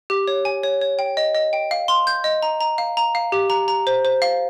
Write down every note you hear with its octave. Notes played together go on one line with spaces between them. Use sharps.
G4
C#5
G#5
C#5
C#5
G5
D#5
D#5
G5
F5
C6
G6
D#5
A#5
A#5
F5
A#5
F5
G4
A#5
A#5
C5
C5
F5